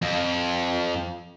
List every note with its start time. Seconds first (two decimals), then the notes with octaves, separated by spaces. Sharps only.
0.02 F2